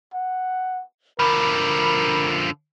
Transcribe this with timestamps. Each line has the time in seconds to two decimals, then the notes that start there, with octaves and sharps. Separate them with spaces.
0.14 F#5
1.19 D3 F3 A#4 B5